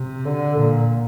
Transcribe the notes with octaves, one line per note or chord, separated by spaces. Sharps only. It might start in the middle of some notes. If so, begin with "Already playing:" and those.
Already playing: C3
D3
A#2